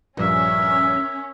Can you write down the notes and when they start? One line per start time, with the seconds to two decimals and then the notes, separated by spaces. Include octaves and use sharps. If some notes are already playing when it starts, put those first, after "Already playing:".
0.17 A#1 G2 A#2 C#4 A#4 E5